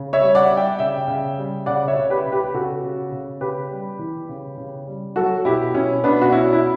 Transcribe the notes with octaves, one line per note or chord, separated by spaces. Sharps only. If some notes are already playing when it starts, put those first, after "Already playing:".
Already playing: C#3
C#5 E5
G3
D5 F#5
G3
E5 G5
C#3 E5 G5
C#3
G3
C#3 D5 F#5
C#5 E5
C#3
G4 B4
C#3
G4 B4
C#3 F#4 A4
C#3
C#3
C#3 G4 B4
G3
E3
C#3
C#3
G3
F#3 F#4 A4
B2 E4 G4
B2 C#4 E4
B2 B3 D4
F#4
B2 C#4 E4
E4